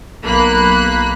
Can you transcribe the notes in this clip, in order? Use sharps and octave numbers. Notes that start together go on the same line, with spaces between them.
B1 A#3 B5 F#6